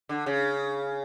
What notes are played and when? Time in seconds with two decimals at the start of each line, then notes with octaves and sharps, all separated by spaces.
0.09 D3
0.26 C#3